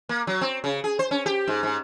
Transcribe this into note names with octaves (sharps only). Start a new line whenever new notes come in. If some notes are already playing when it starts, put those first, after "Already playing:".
A#3
F#3
C4
C#3
G#4
C5
C#4
G4
G#2
G#2